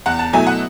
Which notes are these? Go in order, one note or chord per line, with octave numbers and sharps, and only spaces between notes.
E2 F#5
A5
B2 F#3 A3 E4 G#5
F#5